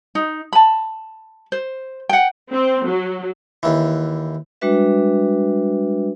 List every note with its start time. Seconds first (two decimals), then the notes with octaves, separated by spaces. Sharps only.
0.15 D#4
0.53 A5 B5
1.52 C5
2.09 F#5 G5
2.51 C4
2.86 F#3
3.63 D#2 E3
4.61 G3 G#3 D4 F#4 B4 E5